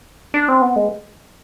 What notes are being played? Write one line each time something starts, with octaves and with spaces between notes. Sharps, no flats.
D4
C4
B3
G#3